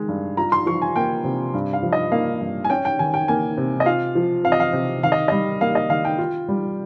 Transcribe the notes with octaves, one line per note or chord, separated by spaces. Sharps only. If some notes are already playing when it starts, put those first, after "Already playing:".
Already playing: D#3 G#3
G2
F4 A#5
C6
F3 C#6
G#5
A#3 G5
C3
G2
F5
F3
D#5
A#3 F5
G2
G#5
C#4 G5
G5
D#3 G#5
G5
A#3 G#5
C3
D#5
F4 F5
F3
C4 F5
D#5
F5
C3
D#3 F5
D#5
G3 D#5
A#3 F5
D#5
D#3 F5
G5
F4
G3